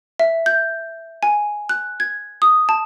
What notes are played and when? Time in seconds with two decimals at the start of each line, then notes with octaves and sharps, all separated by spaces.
0.20 E5
0.46 G6
1.23 G#5
1.69 F#6
2.00 G#6
2.42 D#6
2.69 A5